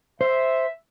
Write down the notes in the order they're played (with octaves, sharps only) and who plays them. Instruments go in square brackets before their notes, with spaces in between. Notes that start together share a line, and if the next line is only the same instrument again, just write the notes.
[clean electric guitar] C5 [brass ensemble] E5